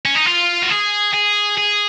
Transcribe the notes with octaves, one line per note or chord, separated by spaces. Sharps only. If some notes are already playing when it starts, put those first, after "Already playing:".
C#4
D#4
F4
F#4
G#4
G#4
G#4